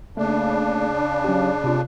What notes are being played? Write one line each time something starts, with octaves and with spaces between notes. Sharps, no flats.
C#3 A3 A#3 D4
F#3 C#4 G4
C3 F4